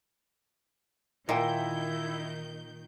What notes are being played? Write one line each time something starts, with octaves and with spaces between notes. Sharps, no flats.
A#2 D#3 E4 D#5 E5 G5 G6